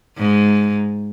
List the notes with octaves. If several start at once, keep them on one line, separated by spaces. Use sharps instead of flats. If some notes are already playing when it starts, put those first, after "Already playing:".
G#2